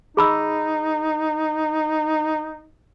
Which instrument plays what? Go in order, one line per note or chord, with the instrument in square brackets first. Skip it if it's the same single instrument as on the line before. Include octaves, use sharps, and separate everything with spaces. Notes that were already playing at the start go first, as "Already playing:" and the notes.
[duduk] D#4 [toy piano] G#4 B5 E6